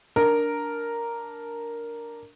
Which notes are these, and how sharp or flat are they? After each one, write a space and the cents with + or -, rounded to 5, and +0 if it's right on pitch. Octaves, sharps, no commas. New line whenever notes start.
D4 -5 A#4 +0